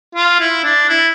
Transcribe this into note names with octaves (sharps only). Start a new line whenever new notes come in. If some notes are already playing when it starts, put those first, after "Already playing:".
F4
E4
D4
E4